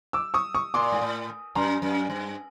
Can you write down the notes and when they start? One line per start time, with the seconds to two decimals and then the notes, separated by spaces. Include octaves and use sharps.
0.13 D6 E6
0.34 C#6 D#6
0.55 C#6 D#6
0.74 A#2 C6 D6
0.92 G#2
1.01 A2
1.55 F#2 A#5 C6
1.82 F#2
2.10 G2